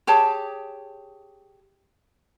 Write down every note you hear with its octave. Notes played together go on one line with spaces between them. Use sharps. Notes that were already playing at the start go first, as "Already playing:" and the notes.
G4 G#4 C#5 A5